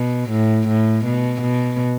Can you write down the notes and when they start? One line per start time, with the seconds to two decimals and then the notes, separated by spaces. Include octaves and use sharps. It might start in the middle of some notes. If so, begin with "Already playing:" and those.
Already playing: B2
0.31 A2
0.68 A2
1.05 B2
1.42 B2